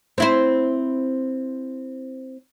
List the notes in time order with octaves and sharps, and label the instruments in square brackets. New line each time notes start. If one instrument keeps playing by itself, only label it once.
[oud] C4 E4 C5